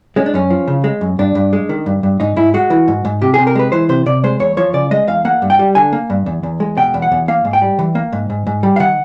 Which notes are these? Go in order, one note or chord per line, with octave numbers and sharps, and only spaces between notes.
G#3 C#4
D4
F#2 C#4
F3
C#3
G#3
F#2
G2 D4
G2
G#3
D#3
G2
G2
G#2 D#4
G#2 E4
G#3 F#4
E3
G#2
G#2
C3 G4
G#4
C3
A#4
G#3 B4
E3 C5
C3 C5
C3 D5
G#3 C5
E2 C#5
F3 C#5
C#3 D5
G#3 D#5
E2 F5
A#3 F#5
G2
G5
G3
D3 G#5
A#3
G2
E2
E2
G#3
B2 G5
E2
F#5
E2
A#3 F5
G#2
G5
G3
E3
A#3
G#2
G#2
G#2
G3
F5
D#3 F#5